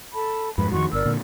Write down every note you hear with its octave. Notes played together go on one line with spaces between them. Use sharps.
A4 A5 B5
F2 G#2 B4 B5
F2 D3 D#3 F#4 C6 C#6
G1 A#4 D5 E6
A#2 D3